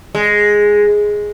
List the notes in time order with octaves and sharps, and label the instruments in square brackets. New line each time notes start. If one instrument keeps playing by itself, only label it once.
[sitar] G#3